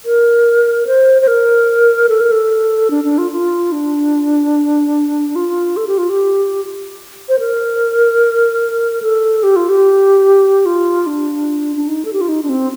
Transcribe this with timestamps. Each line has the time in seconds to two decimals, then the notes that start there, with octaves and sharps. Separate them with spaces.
0.05 A#4
0.87 C5
1.22 C5
1.27 A#4
2.09 A4
2.21 A#4
2.32 A4
2.91 D4
3.04 D4
3.18 F4
3.32 F4
3.72 D4
5.36 F4
5.77 A4
5.87 G4
5.98 F4
6.09 G4
7.29 C5
7.40 A#4
9.02 A4
9.43 G4
9.56 F4
9.69 G4
10.66 F4
11.07 D4
11.76 D4
11.88 D#4
12.05 A4
12.13 G4
12.21 F4
12.29 D#4
12.43 D4
12.49 C4